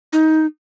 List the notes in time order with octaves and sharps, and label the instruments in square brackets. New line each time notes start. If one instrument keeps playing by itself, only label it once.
[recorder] D#4